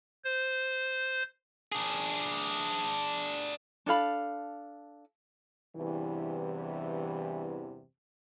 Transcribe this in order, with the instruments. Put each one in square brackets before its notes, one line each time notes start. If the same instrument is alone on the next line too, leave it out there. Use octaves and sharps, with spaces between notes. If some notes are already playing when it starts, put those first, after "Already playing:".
[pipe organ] C5
[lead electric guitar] D4 G#4
[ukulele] D4 A4 F5 B5
[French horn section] E2 G2 C3 E3